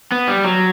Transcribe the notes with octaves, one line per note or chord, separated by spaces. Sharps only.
B3
G3
F#3